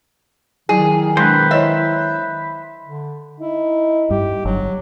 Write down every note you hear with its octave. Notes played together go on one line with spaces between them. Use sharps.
D#3 F#3 E4 G#4
B2 G#3 D4 B4 C5
E4 C#5 D#5 E5
D3
D#4 E4
G2 G4
G1 F#3